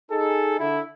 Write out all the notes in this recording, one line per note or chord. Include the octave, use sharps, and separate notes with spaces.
D#4 G#4 A4
D3 E4